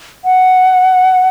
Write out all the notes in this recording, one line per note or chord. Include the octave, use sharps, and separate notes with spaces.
F#5